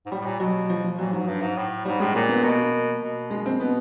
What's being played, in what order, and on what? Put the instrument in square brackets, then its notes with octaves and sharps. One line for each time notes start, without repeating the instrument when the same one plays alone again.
[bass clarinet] G#2
[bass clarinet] A2 [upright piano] G3
[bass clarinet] A2
A#2
[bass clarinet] B2 [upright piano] F#3
[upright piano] F3
F3
[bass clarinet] A#2 [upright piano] F#3
[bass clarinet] G#2 [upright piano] F#3
[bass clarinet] G2
G#2
A2
[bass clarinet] G#2 [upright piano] G3
[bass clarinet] A2 [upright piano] G#3
[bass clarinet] A#2 [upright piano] A#3
[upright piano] B3
[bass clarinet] B2 [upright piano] A#3
[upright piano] A#3
[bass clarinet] B2
[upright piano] G#3
C4
[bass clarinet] B2 [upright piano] B3